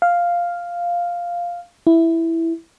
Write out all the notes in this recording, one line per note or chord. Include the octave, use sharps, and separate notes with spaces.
F5
E4